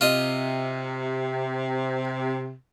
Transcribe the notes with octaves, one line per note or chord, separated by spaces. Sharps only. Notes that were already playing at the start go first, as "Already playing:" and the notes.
C3 F4 D#5